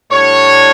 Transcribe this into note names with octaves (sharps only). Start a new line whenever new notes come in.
A2 G3 D4 C#5